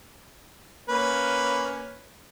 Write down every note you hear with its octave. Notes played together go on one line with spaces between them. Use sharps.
A#3 C#4 B4